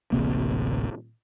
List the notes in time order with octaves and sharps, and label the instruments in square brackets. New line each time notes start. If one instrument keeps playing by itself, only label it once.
[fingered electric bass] D1 A1 C3 A#3